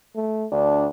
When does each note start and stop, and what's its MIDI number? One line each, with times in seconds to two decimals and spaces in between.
0.15 0.47 57
0.52 0.89 38
0.52 0.86 62